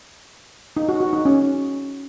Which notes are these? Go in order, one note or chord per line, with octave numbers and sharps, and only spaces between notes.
D#4
F#4
F#4
D#4
C#4